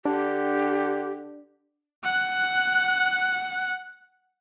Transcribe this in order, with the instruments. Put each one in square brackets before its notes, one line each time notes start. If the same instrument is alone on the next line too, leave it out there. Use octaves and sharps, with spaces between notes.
[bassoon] D3 [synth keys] D4 [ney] G4
[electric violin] F#5 F#6